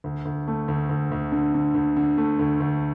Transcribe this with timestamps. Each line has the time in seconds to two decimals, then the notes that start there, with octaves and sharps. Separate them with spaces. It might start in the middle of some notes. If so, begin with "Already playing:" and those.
0.04 D2
0.25 D2
0.48 A3
0.68 D2
0.89 D2
1.11 D2
1.32 D3
1.54 D3
1.75 D2
1.97 D3
2.17 A3
2.39 D2
2.60 D2